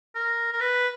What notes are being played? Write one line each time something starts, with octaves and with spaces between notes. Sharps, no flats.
A#4
A#4
B4